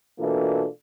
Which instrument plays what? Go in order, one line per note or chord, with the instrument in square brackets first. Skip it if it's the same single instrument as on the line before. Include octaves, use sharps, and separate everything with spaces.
[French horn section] B2 E3 A#3 D4 F4 A4